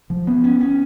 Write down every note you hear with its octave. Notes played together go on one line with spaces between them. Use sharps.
F3
B3
C#4
C#4